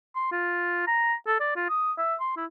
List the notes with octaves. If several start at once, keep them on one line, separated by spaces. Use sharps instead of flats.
C6
F4
A#5
A4
D5
F4
D#6
E5
C6
E4